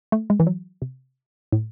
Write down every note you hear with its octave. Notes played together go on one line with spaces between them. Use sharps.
A3
G#3
E3
F#3
C3
A2